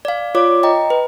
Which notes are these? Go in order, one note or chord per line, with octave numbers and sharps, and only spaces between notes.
D5 F5
F4 C#5 D5 D6
D#5 G5 A#5
B4